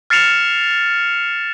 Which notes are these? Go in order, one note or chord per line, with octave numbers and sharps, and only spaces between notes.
F6 A6 C7 C#7 E7 F7